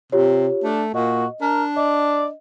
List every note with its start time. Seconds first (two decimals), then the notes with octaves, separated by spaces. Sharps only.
0.12 C3 F4 G4 C#5
0.64 A3 D4
0.95 A#2 F#4 D#5
1.42 D4 A#4
1.76 D5 D#5